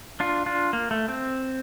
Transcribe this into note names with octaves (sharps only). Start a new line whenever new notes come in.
D4 F4
D4 F4
A#3
A3
C4